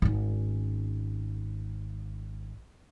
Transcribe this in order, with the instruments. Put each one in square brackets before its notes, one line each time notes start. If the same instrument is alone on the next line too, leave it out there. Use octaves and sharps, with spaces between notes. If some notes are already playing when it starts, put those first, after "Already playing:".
[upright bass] G#1 C#4